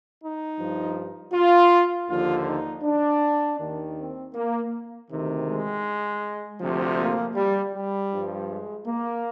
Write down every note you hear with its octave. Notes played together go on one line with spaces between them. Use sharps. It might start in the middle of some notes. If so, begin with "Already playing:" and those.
D#4
G2 F3
F4
D#2 D3 F3 F4
D#4
D4
D#2 D#3
C4
A#3
D2 C3 D#3
G#3
D2 C3 F3
A#3
G3
G3
G2 F3
G#3
A#3